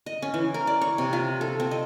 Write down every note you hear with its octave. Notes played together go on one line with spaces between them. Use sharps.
D#5
C#4
E3
A#4
D5
C#5
C3
F4
A4
C4
D#5